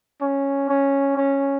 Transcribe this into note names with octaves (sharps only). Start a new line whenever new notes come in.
C#4
C#4
C#4